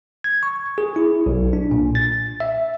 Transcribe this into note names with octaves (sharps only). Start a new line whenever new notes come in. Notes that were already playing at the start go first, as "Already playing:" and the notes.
G#6
C#6
G#4
E4
B1
D4
A#2
A6
E5